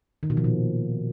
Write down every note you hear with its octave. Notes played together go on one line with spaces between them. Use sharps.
D#3
B2
F3
A#2